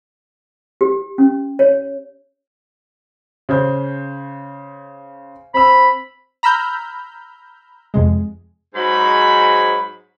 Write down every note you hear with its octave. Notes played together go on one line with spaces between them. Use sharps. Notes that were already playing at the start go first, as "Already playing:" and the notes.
G4
C#4
C#5
C#3 C5 G6
C4 B5 E6
A#5 B5 E6 F6 G6
F2 C3 G#3
G#2 F#3 B5